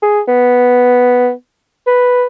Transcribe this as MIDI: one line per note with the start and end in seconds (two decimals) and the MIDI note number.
0.03 0.20 68
0.28 1.31 59
1.87 2.26 71